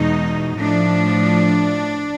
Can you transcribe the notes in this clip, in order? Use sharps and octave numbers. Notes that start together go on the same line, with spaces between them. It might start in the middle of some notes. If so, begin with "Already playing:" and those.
Already playing: E2 B2 G#3 D#4
A2 F3 A3 D4